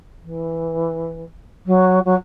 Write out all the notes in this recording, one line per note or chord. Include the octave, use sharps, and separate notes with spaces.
E3
F#3
F#3